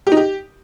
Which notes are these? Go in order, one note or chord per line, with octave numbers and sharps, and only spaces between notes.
G4
D#4
G4